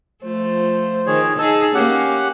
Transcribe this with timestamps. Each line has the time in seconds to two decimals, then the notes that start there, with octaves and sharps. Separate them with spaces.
0.23 F3 A3 C5
1.07 D#3 G#4 C#5
1.39 D#4 G#4 A5 E6
1.75 A#3 C#4 G4 F#5